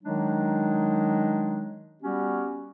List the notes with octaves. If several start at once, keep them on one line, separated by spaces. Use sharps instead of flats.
D#3 F#3 G#3 D4 D#4
G3 B3 C#4 F#4 G4